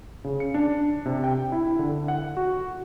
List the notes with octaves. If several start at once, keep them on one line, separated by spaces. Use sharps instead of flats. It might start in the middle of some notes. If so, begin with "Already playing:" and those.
C#3
C#7
D4
C3
G5
E4
D3
F#5
F#4